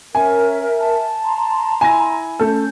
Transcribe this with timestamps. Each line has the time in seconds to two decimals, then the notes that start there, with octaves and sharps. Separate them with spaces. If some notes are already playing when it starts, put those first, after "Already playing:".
0.15 C#4 A#4 E5 G#5
0.80 A5
1.23 A#5 C6
1.81 E4 G#5 A#6
2.40 A3 C#4 A4 G6